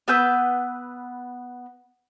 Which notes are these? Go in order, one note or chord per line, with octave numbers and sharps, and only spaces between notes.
B3 B4 E6 G6